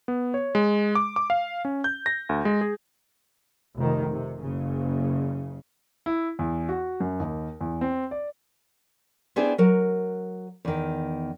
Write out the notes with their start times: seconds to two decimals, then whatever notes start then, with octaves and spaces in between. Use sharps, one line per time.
0.08 B3
0.34 C#5
0.55 G#3
0.95 D6
1.16 D6
1.30 F5
1.65 C#4
1.84 G6
2.06 A#6
2.29 D2
2.45 G#3
2.61 G#4
3.76 F1 D#3
4.13 C3
4.42 F#1 C#3
6.06 E4
6.39 E2
6.69 F#4
7.00 F#2
7.20 D#2
7.61 E2
7.81 C4
8.11 D5
9.36 B3 C4 D4 E4 G#4
9.58 F#3 A#4
10.65 E2 D#3